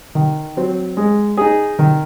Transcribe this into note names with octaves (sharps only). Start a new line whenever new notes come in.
D#3
F#3 C4
G#3
D#4 G#4
D#3